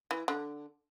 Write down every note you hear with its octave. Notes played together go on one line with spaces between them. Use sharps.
E3
D3